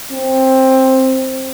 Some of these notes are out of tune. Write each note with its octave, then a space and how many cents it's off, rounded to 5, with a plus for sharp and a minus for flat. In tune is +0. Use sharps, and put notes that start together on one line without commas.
C4 +10